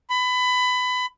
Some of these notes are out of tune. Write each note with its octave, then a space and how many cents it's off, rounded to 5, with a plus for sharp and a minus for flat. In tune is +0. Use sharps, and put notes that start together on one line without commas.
B5 +20